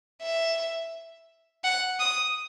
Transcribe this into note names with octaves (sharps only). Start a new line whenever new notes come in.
E5
F#5
D#6